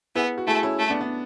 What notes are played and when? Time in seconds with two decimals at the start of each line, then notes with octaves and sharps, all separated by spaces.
0.15 B3 E4 G#4
0.38 F#4
0.47 A3 E4 G#4
0.63 C#4 E4
0.79 A3
0.90 B3 D4
1.01 B3 D4